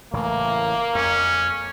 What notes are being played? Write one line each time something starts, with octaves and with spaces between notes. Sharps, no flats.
A1 A2 C#3 A#3
F2 C#4